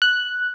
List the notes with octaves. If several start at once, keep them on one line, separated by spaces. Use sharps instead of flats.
F#6